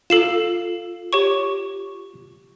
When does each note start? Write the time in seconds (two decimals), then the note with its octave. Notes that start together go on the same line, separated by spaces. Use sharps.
0.10 F4 A4 C7 E7
1.13 G4 C#5 C#6